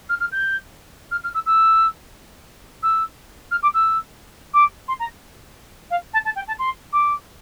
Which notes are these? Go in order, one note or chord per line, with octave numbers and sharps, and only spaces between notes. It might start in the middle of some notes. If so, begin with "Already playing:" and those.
F6
F6
G6
F6
F6
E6
E6
E6
F6
D6
E6
D6
C6
A#5
F5
A5
A5
G5
A5
C6
D6